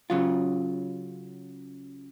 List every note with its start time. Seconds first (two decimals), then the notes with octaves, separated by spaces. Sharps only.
0.10 C#3 F#3 F4